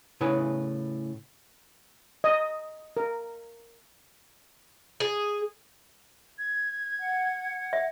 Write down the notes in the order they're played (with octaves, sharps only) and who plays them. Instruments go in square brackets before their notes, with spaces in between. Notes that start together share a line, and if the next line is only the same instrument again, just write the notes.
[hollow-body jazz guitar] A2 C#3 E4 G#4 B4
[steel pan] D#5
A#4
[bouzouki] G#4
[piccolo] G#6
[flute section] F#5
[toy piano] E5